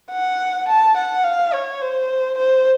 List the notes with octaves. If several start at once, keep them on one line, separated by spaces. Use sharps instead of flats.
F#5
A5
F#5
F5
C#5
C5
C5